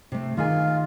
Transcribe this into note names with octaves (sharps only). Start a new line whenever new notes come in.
C3 A3
D#3 F4 G#4 G#5